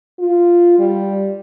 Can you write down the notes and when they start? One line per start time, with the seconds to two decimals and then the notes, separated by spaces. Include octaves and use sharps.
0.19 F4
0.79 G3